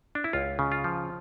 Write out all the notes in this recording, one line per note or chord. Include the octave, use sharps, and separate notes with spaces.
D4
E4
C#2 F4
C#3
F4
F3